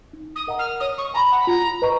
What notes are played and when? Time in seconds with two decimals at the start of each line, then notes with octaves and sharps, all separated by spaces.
0.13 D#4
0.35 D#6
0.47 A#4 D#5 F#5 A#5
0.59 F6
0.80 C#5 D#6
0.98 C#6
1.14 G#5 A#5 B5
1.31 F#5
1.40 B5
1.47 F4 A#5
1.82 B4 D#5 A#5 C#6